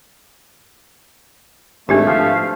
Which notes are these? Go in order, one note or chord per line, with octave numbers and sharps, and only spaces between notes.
G#1 A3 D4 G4 B5
F3 B4 E5 F5